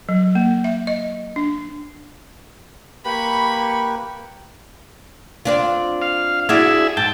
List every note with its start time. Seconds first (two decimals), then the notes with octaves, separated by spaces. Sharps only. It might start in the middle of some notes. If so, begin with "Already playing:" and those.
0.09 F#3
0.35 A#3
0.64 E5
0.87 D#5
1.36 D4
3.05 A#3 G4 B4 B5 C#6
5.45 C4 D4 F4
6.02 F5
6.49 D4 E4 F#4 G#4 E5
6.97 G#2 G5 A5